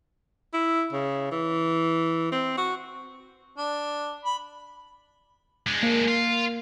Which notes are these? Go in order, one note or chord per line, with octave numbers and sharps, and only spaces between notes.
E4
C#3
E3
C4
F#4
D4
B5
G#3 D4
A#3
F4